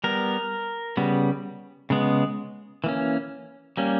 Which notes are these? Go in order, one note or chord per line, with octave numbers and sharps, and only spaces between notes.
G3 B3 A#4
C#3 G3 B3
C#3 G#3 B3
E3 A#3 C#4
G3 A#3 C#4